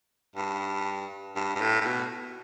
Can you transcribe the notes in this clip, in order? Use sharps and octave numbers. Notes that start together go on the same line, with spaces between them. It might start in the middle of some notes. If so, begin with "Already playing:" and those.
G2
G2
G2
A2
A2
B2